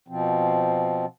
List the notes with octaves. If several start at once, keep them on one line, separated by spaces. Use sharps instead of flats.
B2 F3 C4